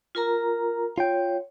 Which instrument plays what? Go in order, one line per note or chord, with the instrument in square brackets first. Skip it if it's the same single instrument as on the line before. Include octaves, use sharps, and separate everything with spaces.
[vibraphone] F4 A#4 A#5
[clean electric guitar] F4 G5 [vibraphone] C#5